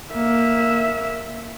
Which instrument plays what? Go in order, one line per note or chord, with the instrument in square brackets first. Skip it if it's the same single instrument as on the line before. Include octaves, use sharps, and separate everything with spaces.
[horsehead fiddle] A#3 E5